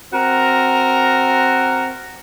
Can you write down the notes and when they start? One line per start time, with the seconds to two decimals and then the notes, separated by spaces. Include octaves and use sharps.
0.11 C4 F#4 A#4